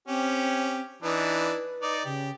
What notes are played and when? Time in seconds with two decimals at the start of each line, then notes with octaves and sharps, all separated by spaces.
0.08 C4 C#4 G4
1.03 E3 D4 D#4 B4
1.82 D#4 D5
2.05 C#3 G4